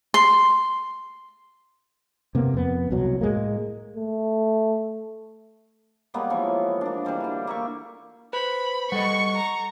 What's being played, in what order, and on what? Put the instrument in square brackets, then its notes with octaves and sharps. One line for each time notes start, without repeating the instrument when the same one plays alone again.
[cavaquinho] C6
[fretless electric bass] C3 A#3 B3
F2 B3
C2 B2 F#3
A2 G#3 A#3
[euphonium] A3
[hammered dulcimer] G3 G#3 A#3 B3
E3 F3 C#5
A#3 D4
E3 G3 G#3 D4
D3 D4
A#3 E5 C#6
[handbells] B4 C5 [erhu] B5
[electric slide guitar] G3 A4 D#5 [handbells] F#5 [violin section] C#6
[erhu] A#5